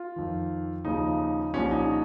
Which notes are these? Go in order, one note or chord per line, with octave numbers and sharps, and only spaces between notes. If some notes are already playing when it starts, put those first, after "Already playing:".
Already playing: F4
F2 D#3
D#2 C#3 F3 D#4
C2 A#2 F3 C#4
D#4